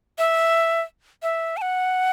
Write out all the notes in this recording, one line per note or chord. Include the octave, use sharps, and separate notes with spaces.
E5
E5
A5
F#5